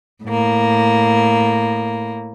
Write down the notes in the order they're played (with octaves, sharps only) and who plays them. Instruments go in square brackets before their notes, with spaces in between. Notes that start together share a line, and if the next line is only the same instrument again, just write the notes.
[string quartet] A2 A#3